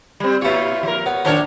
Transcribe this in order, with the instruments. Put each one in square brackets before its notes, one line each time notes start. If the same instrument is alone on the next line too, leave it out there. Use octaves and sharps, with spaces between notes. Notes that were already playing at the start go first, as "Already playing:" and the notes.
[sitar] G3 C4
[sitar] A#2 F4 [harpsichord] E4 C#5
[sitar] F3 A#4
[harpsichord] B3 [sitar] C#5
[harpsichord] A#1 D4 C5 [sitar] D#3 A#4 C#5